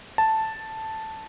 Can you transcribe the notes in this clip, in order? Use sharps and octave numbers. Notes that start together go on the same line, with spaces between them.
A5